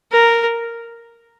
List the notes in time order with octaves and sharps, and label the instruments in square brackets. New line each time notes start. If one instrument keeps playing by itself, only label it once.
[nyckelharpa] A#4